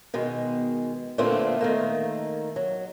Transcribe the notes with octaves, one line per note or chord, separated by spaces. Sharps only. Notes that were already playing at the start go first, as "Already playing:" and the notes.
B2 D#3 G#3
A#2 D3 A3 B3 C4 F4
D#3 A3 A#3
F#3